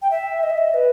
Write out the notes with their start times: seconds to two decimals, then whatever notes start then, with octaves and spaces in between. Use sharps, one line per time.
0.02 G5
0.11 E5
0.43 D#5
0.50 E5
0.57 D#5
0.74 B4